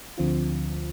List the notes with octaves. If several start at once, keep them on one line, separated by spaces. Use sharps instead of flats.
D2 D3 F3 C4 F4